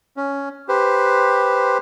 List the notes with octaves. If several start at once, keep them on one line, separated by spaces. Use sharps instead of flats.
C#4
G4 B4 C5